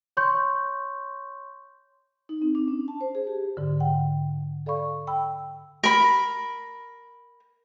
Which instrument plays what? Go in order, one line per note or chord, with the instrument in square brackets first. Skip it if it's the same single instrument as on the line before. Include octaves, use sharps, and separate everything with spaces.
[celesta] C#5 C6 C#6 G6
[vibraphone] D#4
C4
D4
C#4
A5
C5
G#4
G4
[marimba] G#2 D3
F#5 G5
A4 D5 F5 B5 C#6
G5 B5 E6
[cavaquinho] A#4 B5